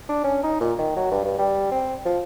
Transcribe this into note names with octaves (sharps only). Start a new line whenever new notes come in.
D4
C#4
D#4
A#2
D#3
F#3
G2
G2
G3
C4
F3